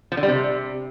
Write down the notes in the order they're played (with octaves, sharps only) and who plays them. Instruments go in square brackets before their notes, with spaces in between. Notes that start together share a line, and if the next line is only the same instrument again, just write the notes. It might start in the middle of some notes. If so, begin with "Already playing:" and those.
[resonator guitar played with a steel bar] F3
D3
G3
C3